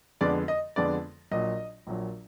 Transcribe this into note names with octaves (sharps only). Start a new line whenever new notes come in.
F2 D3 G#3 B3 D5
D#5
F2 D3 G#3 B3 D5
A#1 A#2 F#3 D#5
A#1 A#2 F#3